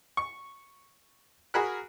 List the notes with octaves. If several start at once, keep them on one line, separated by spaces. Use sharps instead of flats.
C#6
F#4 G#4 A#4 G#5 B5 F#6